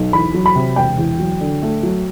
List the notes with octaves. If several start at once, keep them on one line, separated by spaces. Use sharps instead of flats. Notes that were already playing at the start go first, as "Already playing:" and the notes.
Already playing: B1
E2 B5
F#3
B5
C3
E1 G5
E2
F#3
D3
A3
F#3